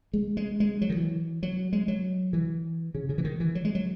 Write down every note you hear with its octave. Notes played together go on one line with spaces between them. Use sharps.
G#3
G#3
G#3
F#3
D#3
E3
F#3
G#3
F#3
E3
C#3
C#3
E3
D#3
E3
F#3
G#3
F#3